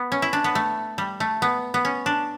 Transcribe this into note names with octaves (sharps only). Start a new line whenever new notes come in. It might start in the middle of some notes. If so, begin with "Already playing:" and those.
Already playing: B3
C#4
E4
D4
B3
A3
G3
A3
B3
B3
C#4
D4